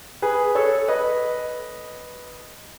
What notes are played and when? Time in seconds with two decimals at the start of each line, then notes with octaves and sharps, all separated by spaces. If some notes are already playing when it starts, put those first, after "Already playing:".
0.22 G#4 B4
0.55 A4 C#5
0.88 B4 D#5